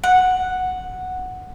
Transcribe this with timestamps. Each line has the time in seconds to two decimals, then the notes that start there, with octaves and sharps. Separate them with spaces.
0.04 F#5